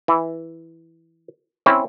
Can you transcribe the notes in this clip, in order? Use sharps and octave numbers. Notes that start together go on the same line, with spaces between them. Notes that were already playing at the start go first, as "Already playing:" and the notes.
E3
C4 C#4 E4